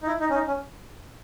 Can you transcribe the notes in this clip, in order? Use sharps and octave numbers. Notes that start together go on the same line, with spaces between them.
D#4
E4
D#4
C#4
D#4
C#4